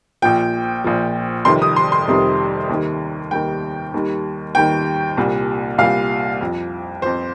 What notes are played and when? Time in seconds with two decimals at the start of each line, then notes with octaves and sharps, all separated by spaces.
0.22 A#1 A#2 F3 G5
0.84 A#1 A#2 F3
1.45 F1 F2 C3 D#3 G3 C6
1.62 D#6
1.76 C6
1.92 C6
2.07 F1 F2 C3 D#3 G3
2.69 D#2 D#3 G3
3.31 D#2 D#3 G3 G5
3.94 D#2 D#3 G3
4.55 D#2 D#3 G3 G5
5.17 C2 A#2 G3
5.78 C2 A#2 G3 F5
6.41 F2 F3
7.02 F2 F3 C5